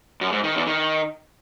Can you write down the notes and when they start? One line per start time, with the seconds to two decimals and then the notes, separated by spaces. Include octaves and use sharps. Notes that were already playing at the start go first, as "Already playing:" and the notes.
0.21 F#2
0.33 G#2
0.44 D#3
0.55 E2
0.67 D#3